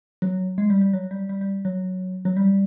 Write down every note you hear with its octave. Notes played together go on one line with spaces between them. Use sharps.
F#3
G#3
G3
G3
F#3
G3
G3
G3
F#3
F#3
G3